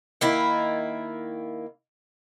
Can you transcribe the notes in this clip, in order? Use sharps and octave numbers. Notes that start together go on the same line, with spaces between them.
D#3 A#3 E4